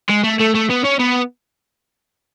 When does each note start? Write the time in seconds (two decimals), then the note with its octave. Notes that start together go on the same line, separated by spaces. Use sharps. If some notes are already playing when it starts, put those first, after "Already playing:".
0.09 G#3
0.23 A3
0.40 A3
0.54 A3
0.70 B3
0.84 C#4
0.99 B3